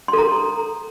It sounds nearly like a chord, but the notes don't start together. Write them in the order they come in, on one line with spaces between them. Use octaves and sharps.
C6 A4 A#5